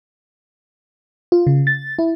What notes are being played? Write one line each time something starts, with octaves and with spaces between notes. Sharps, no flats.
F4
C#3
A6
E4